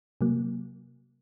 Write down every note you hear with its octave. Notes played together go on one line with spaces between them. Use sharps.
C3 F#3 A#3